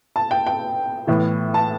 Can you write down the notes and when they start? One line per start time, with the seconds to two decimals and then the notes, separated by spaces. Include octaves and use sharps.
0.16 A5
0.31 G5
0.47 G5
1.07 A2 E3 B3
1.54 A5